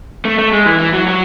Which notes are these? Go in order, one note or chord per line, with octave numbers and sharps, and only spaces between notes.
A3
A3
G#3
E3
E3
F#3
F#3